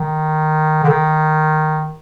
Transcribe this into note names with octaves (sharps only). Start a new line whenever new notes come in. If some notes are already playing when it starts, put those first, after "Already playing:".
Already playing: D#3
D3
D#3